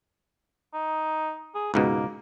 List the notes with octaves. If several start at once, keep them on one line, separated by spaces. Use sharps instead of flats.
D#4
G#4
C#2 G#2 B2 A#3